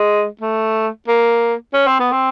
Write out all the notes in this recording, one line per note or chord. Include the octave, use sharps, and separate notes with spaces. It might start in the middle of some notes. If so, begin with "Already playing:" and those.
Already playing: G#3
A3
A#3
C#4
C4
B3
C4